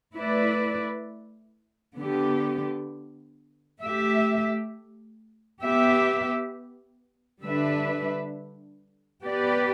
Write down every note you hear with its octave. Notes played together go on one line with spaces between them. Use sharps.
A3 E4 B4 D5
D3 B3 G4
A3 G4 E5
B3 G4 E5
D3 G3 D4 B4 E5
B3 G4 B4 D5